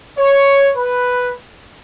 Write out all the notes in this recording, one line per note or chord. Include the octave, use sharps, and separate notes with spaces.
C#5
B4